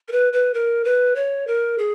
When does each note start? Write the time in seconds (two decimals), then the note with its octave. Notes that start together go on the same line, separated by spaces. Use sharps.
0.08 A#4
0.12 B4
0.33 B4
0.54 A#4
0.85 B4
1.16 C#5
1.47 A#4
1.78 G#4